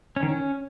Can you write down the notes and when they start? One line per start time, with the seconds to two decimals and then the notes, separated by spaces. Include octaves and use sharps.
0.16 C#4
0.23 D#3
0.29 C#4